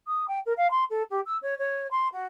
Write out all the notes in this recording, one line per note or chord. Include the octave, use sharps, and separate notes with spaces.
D#6
G5
A#4
F5
C6
A4
G4
E6
C#5
C#5
C6
F#4